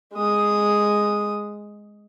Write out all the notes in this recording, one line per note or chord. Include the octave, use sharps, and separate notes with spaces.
G#3 D#6